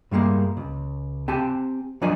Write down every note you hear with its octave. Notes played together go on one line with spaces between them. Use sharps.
G2 G3 G#3 A#3
C#2
C4 G4 G#5 A5
F3 F#3 D4 D5 D#5 G#5